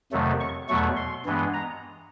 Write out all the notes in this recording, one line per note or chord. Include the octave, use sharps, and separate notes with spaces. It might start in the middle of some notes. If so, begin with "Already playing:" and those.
F2 C3 D#3 F#3 A3
C#6
E2 B2 F#3 A3 C#6
C6
G2 E3 G#3 B3
A#5